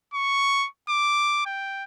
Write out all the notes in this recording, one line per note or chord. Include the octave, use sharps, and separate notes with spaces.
C#6
D6
G5